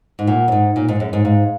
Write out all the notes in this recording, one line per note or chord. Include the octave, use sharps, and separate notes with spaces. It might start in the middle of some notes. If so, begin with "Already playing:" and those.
G#2
A#2 F#5
F#2
G#2 D#4
A#2 C#5
G#2
F#2 G#4
G#2
G#2 F5